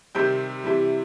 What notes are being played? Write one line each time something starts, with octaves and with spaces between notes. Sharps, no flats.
C3 D#3 G3 C4 G6
C3 E3 G3